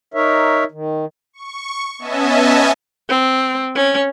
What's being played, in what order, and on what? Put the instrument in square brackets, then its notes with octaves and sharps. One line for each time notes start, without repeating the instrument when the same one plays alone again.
[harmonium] D#4 A#4 C#5 E5
D#3
[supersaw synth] C#6
B3 C#4 D#5 E5 G#5 A5
[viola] C4
C#4